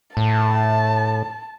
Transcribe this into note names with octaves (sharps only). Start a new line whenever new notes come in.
A2 A5